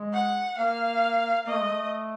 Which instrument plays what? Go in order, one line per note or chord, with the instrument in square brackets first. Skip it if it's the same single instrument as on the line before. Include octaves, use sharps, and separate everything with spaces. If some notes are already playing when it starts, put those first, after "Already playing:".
Already playing: [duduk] G#3
[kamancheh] F#5
[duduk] A#3 [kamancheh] F5
[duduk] A#3 [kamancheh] D#5
[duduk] A3
G#3
A3